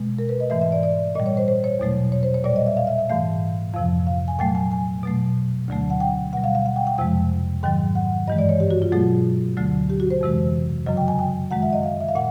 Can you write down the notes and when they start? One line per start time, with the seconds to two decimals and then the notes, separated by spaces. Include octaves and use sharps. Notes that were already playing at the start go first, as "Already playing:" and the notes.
Already playing: B2 G#3
0.19 A#4
0.29 B4
0.40 D#5
0.50 G#2 E3 A3 E5
0.62 E5
0.72 D5
0.83 D5
1.15 A#2 G3 D#5
1.26 C#5
1.37 C5
1.48 C5
1.64 C#5
1.79 E2 B2 F#3 A3
2.12 C#5
2.23 C5
2.34 C#5
2.44 A#2 G3 D5
2.56 D#5
2.66 E5
2.77 F5
2.87 E5
2.99 E5
3.10 G#2 E3 A3 F5
3.74 F2 C3 F3 F5
4.07 F5
4.28 G#5
4.39 A#2 F#3 A3 G5
4.55 G#5
4.72 G#5
5.03 B2 F#3 A3
5.68 D2 D3 F#3 A3
5.90 F#5
6.00 G5
6.33 B2 G3 F#5
6.44 F5
6.55 F5
6.66 F#5
6.76 G5
6.87 G5
6.98 F2 C3 F3 G#3 G5
7.63 G#2 D#3 F#3 G5
7.95 F#5
8.27 G2 E3 G#3 D#5
8.39 D5
8.49 C#5
8.60 G4
8.71 F#4
8.82 F4
8.92 B2 F#3 A3 G#4
9.57 D2 D3 F#3 A3
9.90 G4
10.00 F#4
10.11 C5
10.21 F2 C3 E3 G#3
10.86 F#2 C#3 F#3 D#5
10.97 G5
11.08 G#5
11.19 G5
11.51 F#2 D#3 G#3 F#5
11.62 E5
11.73 D#5
11.83 F5
12.01 E5
12.09 F5
12.15 A#2 F#5